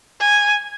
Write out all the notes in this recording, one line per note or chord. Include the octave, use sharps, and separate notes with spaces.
G#5